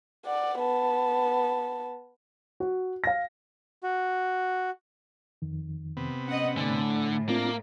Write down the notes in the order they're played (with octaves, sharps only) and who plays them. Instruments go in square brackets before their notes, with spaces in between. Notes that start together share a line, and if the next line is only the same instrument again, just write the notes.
[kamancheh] D5 F#5
B3 A5
[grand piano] F#4
F5 A#6
[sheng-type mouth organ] F#4
[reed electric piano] F2 D#3
[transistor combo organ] C3 B3
[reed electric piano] C#4 [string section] D#5 F#5
[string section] A2 [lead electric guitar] D3 [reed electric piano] G#5 B5 A6
[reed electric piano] A3 C4 F4 [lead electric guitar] A#3 [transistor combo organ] D4 A#5